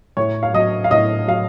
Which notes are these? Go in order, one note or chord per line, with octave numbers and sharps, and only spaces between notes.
A2 C#5
F5
F#3 D#5
F5
A2 D#5
F#3 F5